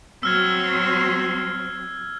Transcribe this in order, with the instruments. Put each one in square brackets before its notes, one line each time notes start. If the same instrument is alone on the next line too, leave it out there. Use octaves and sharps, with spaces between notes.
[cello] F#3 C4 [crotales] E6 F6 G#6